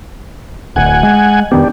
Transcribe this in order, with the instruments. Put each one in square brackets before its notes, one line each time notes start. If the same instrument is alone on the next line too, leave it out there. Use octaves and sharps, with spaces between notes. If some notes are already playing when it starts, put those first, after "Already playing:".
[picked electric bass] D1 D2 [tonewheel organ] F#5 G#5
[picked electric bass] G#3
[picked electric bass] F2 D#3 B3 [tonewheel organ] D4 G4